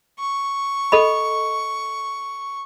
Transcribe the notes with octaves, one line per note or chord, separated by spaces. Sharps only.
C#6
A4 D#5 B5